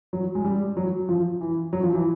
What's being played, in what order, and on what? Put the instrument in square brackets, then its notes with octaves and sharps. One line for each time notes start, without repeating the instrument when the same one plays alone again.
[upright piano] F#3
G#3
G3
F#3
F3
E3
F#3
F3
E3